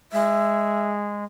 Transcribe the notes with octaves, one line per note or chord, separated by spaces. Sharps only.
G#3 E5